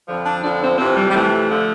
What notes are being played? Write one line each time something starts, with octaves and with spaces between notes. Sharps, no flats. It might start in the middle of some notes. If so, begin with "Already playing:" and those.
F2 D3 F3
D4
F2 D3 F3 D4
C4
F2 C3 E3 C4
G3
G3
F2 C3 E3 A3
D3 F3